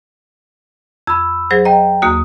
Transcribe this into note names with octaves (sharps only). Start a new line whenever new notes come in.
F2 B5 E6
F#3 G#4 C5
D#5 G5 A#5
D#2 A#3 F#4 D#6